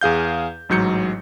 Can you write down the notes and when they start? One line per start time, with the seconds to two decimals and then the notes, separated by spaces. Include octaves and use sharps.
0.01 E2 G#4 F5 G6
0.69 A1 G#2 F#3 G6 C#7